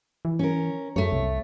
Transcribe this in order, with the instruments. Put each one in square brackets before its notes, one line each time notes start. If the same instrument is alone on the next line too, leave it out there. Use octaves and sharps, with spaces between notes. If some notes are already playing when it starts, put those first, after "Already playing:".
[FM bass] E3
[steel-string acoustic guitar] C#4 A#4
[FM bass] F#2 [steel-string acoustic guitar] A3 C#5
[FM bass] C2